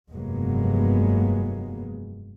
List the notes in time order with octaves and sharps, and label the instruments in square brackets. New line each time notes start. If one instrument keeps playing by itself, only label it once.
[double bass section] F1 G2 F#3 G#3 A#3 B3